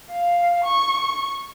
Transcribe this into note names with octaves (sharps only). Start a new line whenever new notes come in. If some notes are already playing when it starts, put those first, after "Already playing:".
F5
C#6